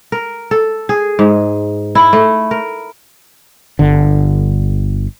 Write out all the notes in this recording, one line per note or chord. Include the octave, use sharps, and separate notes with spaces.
A#4
A4
G#4
G#2
E4
A3
A#4
G1 D3